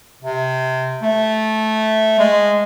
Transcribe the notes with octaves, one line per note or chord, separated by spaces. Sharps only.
C3
A3
G#3